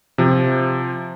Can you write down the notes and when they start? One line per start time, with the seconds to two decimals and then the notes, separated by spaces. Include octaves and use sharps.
0.18 C3 F3